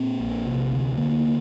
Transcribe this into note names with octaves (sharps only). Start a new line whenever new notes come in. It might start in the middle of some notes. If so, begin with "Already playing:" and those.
Already playing: A#2 C4
A#1
C3
D2
D3 A#3